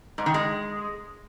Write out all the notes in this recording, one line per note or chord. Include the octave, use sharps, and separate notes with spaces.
G#2
D#3
G#3